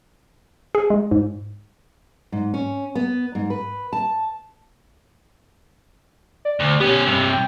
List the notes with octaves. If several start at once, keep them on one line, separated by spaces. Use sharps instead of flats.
G#4
G#3
G#2
G#2
C#4
B3
G#2
B4
A5
D5
D2
B3 C#4 G4
G2 C3
G5